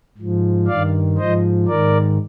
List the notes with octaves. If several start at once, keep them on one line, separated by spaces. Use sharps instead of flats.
G#2 F3
G2 D#3 D5 F5
G#2 F3 C5 D#5
G#2 D#3 A#4 D5